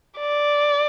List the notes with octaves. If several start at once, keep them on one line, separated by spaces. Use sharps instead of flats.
D5